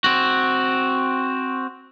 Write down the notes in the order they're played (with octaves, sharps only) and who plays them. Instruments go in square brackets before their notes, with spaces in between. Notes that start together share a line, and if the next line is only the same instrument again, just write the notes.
[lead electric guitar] C4 F#4